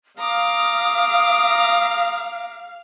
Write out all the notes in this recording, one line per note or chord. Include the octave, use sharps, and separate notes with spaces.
F5 A#5 D6 D#6